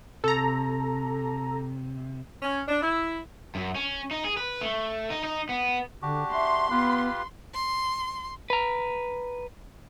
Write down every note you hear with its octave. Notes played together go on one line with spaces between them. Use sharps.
C3 A4 A#5
C#4
D4
E4
F#2
C#4
D#4
G#4
B4
A3
D#4
D#4
B3
D3 D4 F#4 G4
E5 C6
B3 F4 G4 B4
C6
B4 A#5